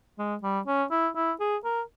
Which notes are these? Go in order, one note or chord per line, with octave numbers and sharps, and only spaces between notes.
G#3
G3
C#4
E4
E4
G#4
A#4